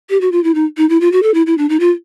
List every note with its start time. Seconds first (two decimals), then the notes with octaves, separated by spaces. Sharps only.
0.10 G4
0.21 F#4
0.32 F4
0.44 E4
0.55 D#4
0.77 D#4
0.89 E4
1.01 F4
1.12 F#4
1.23 A4
1.34 E4
1.47 E4
1.58 D4
1.69 D#4
1.80 F4